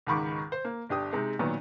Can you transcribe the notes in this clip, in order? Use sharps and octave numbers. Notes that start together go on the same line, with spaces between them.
C#2 G#2 D#3 B5 C#6 D6
C5
A#3
G1 D4 G4 D#6
C3 G#3 D#4
A#2 D#3 F#3 B3